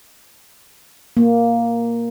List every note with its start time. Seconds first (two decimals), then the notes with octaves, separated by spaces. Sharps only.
1.17 A#3